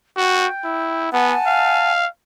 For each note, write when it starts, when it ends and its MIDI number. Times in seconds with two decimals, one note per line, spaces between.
0.17 0.47 66
0.17 1.11 79
0.65 1.11 64
1.13 1.35 59
1.13 1.90 78
1.13 1.90 80
1.13 1.90 81
1.47 2.06 77